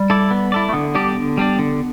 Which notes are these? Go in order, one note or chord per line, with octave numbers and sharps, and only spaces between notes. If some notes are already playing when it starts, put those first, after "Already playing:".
Already playing: G3
E4 A4 D5
B3
E4 A4 D5
A3
D3 B3
G3 D4 G4 D5
D3
G3 D4 G4 D5
D3